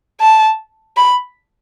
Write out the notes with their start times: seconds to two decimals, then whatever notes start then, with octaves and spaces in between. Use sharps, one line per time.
0.20 A5
0.97 B5